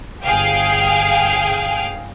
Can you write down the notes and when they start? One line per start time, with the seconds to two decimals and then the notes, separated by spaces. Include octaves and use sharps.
0.23 G1 G#4 F5 G5